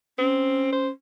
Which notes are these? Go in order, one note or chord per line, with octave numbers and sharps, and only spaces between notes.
C4 C#4
C5